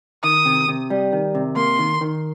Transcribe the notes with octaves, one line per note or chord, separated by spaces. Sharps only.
D#3 D#6
C3
C3
G3
D#3
C3
A#3 C6
D#3
D#3